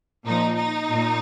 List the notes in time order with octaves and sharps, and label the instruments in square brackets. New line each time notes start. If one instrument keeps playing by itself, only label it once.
[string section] A#2 F3 D#4
D#4
A#2